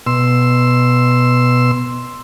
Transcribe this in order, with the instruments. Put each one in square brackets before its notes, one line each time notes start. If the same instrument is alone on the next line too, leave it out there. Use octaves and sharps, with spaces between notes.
[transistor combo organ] B2 C6 E6